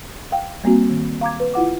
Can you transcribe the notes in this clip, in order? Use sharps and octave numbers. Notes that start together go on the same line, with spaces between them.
F5 G5
G3 A#3 C4 F#4
D#3
F5 A#5 D6 G#6
B4
E4 F4 F#5 D6